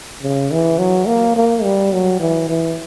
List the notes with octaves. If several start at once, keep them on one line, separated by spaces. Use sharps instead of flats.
C#3
E3
F#3
A#3
A#3
G3
F#3
E3
E3